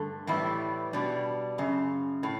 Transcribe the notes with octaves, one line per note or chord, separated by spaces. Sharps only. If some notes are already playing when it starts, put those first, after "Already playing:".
Already playing: G2 D3 A3
A2 E3 G3 B3 E4
B2 G3 D4
F#2 C#3
A2